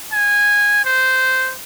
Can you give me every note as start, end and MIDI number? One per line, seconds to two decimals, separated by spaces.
0.12 0.80 80
0.85 1.53 72